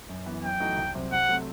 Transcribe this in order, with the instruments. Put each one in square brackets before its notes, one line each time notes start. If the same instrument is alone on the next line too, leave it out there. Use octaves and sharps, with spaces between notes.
[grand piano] F#2
E3 B3
[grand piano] F#2 [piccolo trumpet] G5
[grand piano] E3 A3 D#4 F#4
C2
C3 F#3 C4
[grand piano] C3 [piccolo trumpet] F#5
[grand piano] F#3 A3 C4